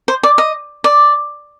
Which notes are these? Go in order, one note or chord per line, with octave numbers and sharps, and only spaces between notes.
C5
D5
D#5
D5